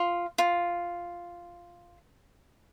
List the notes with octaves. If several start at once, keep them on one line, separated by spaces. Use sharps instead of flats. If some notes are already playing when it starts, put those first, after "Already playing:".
Already playing: F4
F4